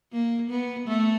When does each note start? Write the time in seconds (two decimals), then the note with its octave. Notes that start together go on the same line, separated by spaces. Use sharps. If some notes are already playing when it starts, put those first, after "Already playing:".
0.12 A#3
0.50 B3
0.88 A3